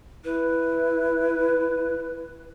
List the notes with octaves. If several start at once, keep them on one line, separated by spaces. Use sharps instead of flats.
E4 B4